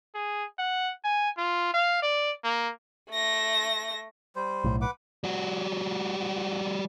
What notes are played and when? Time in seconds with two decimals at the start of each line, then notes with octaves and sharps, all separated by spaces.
0.15 G#4
0.59 F#5
1.04 G#5
1.38 F4
1.74 F5
2.02 D5
2.44 A#3
3.11 A3 A#6
4.36 G3 C5
4.64 B1 A2
4.81 B4 F#5 D6
5.24 G3 F#4